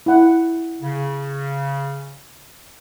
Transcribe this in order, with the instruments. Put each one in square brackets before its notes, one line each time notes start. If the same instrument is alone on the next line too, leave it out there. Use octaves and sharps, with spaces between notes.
[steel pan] E4 F#5
[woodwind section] C#3